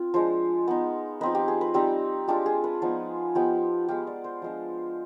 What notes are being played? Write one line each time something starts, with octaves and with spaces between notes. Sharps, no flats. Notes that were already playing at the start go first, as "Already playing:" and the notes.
Already playing: C4 F4
F3 G#3 D4 C5
B3 D#4
F3 C4 D#4 B4
G4
G#4
B4
G3 C4 D#4 G4
G#3 D4 F4 G4
G#4
B4
F3 B3 D#4
F3 B3 D#4 G4
G#3 B3 F4 G4
D5
C5
F3 G#3 D4